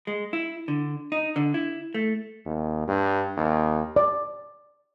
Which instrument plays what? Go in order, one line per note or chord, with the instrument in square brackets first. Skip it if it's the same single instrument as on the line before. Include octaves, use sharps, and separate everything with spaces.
[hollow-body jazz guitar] G#3
E4
D3
D#4
D3
E4
A3
[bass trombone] D#2
G2
D#2
[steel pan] D5